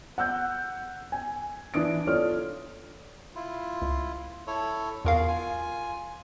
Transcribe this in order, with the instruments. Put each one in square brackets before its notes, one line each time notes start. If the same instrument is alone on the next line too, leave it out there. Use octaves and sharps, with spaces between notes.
[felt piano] F#5 E6 G6
G#5
E3 D4 D#6 D7
F4 A4 C#5 D5 F6
[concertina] E4 F4
[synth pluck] C#2
[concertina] E4 A4 C#5
[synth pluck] E2 A#4 F5 [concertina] F4 F#4 G#4
[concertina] F4 G#5